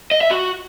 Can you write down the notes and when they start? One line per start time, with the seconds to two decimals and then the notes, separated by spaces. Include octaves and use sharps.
0.11 D#5
0.21 E5
0.31 F#4